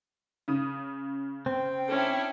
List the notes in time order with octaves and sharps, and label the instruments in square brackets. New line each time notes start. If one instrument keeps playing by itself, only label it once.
[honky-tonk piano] C#3 D#6
[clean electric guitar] C4 [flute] G5
[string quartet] C#4 D4 E4